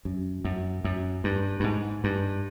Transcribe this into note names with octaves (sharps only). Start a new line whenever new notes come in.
F#2
F#2
F#2
G2
G2
G#2
G2